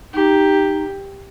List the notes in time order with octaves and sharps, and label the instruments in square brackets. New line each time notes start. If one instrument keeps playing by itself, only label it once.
[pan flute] D#4 [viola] G4